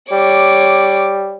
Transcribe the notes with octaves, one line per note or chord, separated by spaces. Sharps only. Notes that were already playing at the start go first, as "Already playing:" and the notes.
G3 C#5 D6